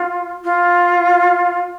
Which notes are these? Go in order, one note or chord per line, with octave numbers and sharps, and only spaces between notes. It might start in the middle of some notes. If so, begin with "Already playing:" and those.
Already playing: F4
F4